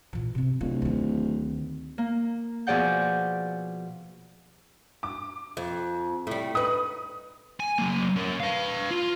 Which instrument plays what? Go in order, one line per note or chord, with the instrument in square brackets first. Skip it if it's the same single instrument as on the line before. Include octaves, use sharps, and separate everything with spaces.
[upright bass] A#2 E3
C3 C4
[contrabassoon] D1 [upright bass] F4
[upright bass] D2 D#3
[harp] A#3
B2 F3 G#4 D5 F#5 G6
[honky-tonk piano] D6
[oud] F2
A2 G3
[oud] D#4 B4 [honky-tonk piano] D#6
[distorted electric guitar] G#5
F#3 A#3
C#4 A#4
B4 F5
F4